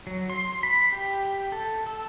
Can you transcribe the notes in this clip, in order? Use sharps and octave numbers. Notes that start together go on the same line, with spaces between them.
F#3
C6
B5
G4
A4
A4